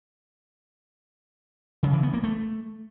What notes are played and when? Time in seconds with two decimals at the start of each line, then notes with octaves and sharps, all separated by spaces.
1.83 C#3
1.93 E3
2.03 B3
2.13 A#3
2.23 A3